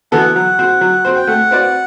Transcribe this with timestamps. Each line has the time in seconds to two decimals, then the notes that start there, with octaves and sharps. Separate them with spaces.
0.12 E3 B3 F#4 A4 F#5
0.35 F#3 F#5
0.59 C4 F#4 C5
0.81 F#3
1.05 C4 F#4 C5
1.16 G5
1.27 A3 F#5
1.51 C4 F#4 B4 D5